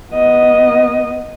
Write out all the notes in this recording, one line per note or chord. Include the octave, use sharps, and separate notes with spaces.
B3 D#5